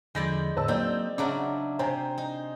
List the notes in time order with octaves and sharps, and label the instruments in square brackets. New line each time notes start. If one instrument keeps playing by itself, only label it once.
[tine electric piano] E2 D3 F3 [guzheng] G#3 E4 D5 [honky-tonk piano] G6 A#6
[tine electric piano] E2 A2 D3 [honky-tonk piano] B4 A5 E6
[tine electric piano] F#3 A#3 [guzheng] C4 D#4 [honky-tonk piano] D5 G6
[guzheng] C#3 F#3 D4 [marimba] C#4 [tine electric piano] E5 A#5 D6
[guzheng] C3 [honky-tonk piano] C5 [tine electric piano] G5 G#5 A#5
[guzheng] D#4